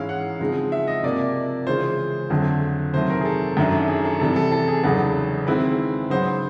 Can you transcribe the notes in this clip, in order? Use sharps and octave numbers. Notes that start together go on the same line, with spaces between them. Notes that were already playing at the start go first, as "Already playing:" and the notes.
Already playing: G#2 E3 G#3 C#4 E4 F5
F#5
C#3 F3 G#3 C4 D#4
E5
D#5
C3 F3 A#3 D5
C#3 E3 G#3 C#4 F4 C5
F2 D3 F#3 A3
C3 D#3 F#3 A3 C5
A#4
G#4
A4
F#2 D#3 F#3 A3 D4
G#4
A4
C3 E3 G3 A4
A4
A4
G#4
E2 C#3 F#3 B3 D#4 A4
D#3 G#3 C4 E4 B4
C#3 F#3 B3 D#4 C5